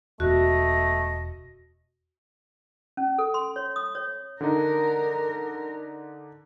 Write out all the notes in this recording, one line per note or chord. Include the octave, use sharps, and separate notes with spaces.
E1 A3 F#4 D#5
C#4
A4
C6
C#5
D#6
C#5
D3 D4 D#4 A#4